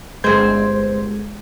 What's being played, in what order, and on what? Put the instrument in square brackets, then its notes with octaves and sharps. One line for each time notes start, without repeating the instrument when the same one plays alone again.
[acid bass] G1 [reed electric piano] G#3 G6 G#6 [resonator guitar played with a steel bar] C4 C5